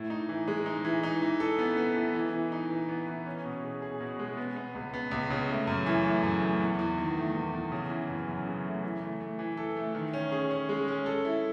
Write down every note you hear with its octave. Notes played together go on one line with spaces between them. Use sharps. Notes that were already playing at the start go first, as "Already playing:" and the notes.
Already playing: A2
D#4
E3
G#3
D#4
E3
D#4
E3
A4
B3
B3
E3
E3
E3
D#4
E3
B3
E3
C#4
B2
G#4
G#4
B2
G#3
B3
B3
C#2
B3
C#2
C#3
A3
F#2
E3
A3
F#2
A3
E2
E2
D#3
A3
E2
E2
C#3
E3
F#2
F#2
C#3
A3
E3
A3
A3
E3
A4
A3
D#3
C#4
G#4
C#4
G#3
C#4
A4
E4